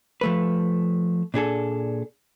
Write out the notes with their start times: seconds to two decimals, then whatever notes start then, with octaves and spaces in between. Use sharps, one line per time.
0.21 F3 A3 B4
1.34 A#2 D4 G#4 A4